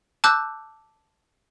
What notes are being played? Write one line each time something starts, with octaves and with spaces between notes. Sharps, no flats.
A5 D6 E6 F#6 G6